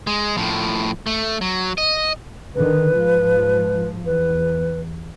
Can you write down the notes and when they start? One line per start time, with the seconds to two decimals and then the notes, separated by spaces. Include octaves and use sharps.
0.07 G#3
0.37 A2 F3
1.07 A3
1.41 F#3
1.78 D#5
2.55 D3 D#3 B4
2.94 G#2 F3
4.06 E2 B4